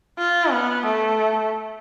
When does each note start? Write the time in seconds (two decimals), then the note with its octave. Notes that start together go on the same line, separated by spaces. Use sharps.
0.18 F4
0.51 B3
0.86 A3